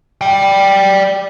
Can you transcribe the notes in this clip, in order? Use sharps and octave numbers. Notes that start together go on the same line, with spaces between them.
D5 G5